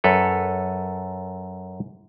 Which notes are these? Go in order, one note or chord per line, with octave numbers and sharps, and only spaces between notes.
F#2 A4 B4 C#5